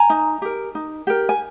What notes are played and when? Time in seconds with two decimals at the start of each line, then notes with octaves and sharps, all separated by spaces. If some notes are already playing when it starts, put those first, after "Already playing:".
Already playing: G#5 A#5
0.10 D#4
0.42 G4 A#4
0.75 D#4
1.07 G4 A#4
1.29 G#5